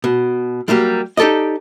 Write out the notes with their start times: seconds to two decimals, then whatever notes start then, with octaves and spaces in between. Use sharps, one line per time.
0.04 B2
0.68 F#3 G3 A#3 G4
1.17 D#4 G4 A4 D5 D#5